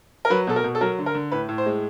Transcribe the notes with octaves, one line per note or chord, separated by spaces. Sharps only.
A#4
F#3 B4
B2 A4
A#4
B2
A4
F#3 A#4
D3
A#4
D3
A2 B4
A2
C5
G#3